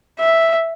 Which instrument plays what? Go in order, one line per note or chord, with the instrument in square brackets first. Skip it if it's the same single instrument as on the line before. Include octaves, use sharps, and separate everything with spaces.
[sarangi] E5